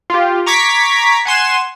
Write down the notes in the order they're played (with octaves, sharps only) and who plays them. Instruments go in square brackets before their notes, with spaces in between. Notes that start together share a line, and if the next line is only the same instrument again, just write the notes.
[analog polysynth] F4 G4
A#5 C#6 D6 G#6 B6
F#5 G#5 C6 E7